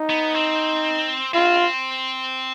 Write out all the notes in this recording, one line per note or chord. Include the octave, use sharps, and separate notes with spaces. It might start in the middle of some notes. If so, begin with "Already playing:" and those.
Already playing: D#4
B3
C4
C4 F4